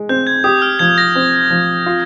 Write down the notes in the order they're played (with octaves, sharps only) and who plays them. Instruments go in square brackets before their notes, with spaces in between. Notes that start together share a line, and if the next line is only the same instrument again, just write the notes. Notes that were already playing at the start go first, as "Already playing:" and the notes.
Already playing: [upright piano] G#3
[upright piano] C4 [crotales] G6
[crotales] G#6
[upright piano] G4 [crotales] D#6
[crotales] F6
[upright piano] F3 [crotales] G#6
[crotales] A#6
[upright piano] C4
F3
F4